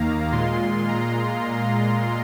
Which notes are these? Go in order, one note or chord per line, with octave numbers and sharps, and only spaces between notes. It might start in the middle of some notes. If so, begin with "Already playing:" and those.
Already playing: D#2 D#3 A#3 F5 A#5
A#2 G#3 F4 C6
A#5